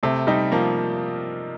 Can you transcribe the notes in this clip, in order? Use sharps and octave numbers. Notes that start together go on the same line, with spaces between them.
C3 A3
G3 D#4
F3 A#3